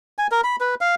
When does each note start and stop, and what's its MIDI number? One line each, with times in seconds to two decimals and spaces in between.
0.18 0.27 80
0.31 0.41 70
0.44 0.56 83
0.60 0.75 71
0.81 0.95 77